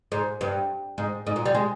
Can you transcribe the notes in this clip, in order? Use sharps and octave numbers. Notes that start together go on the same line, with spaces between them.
G#2
G2
G#2
G#2
A#2
G3
G#3